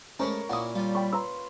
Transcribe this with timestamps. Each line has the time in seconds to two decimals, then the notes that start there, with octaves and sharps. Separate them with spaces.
0.19 G#3 A3 C#4 A#4 C5 C#5 B5
0.49 A#2 A#3 C#4 E4 F#5 B5 D#6
0.75 G3 F4 G#5
0.95 G5 B5 C#6
1.13 B4 F5 A#5 C6 E6